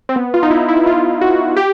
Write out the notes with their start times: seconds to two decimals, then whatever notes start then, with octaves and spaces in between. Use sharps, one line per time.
0.09 C4
0.16 B3
0.34 F4
0.43 D#4
0.51 E4
0.68 E4
0.86 F4
1.21 F#4
1.57 G4